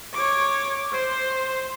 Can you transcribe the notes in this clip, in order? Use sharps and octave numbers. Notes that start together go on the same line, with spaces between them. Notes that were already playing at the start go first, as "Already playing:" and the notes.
C#5 D6
C5